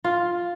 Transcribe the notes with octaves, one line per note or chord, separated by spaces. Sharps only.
F4